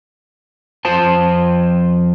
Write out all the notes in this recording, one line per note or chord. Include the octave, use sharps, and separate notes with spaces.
F2 F4 C5 A5